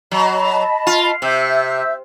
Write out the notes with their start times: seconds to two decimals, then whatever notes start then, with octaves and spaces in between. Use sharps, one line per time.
0.11 F#3 D#5 A5 B5
0.87 F4
1.22 C3 E5 E6 G6